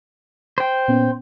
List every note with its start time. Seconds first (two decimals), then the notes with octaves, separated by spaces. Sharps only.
0.58 C5 G5
0.88 A#2 B3 C#4